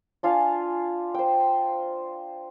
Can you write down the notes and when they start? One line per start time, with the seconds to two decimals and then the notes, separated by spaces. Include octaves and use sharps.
0.23 D4 F4 F5 G#5
1.14 C5 G5